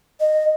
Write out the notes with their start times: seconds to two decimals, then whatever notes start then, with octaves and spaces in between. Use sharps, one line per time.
0.20 D#5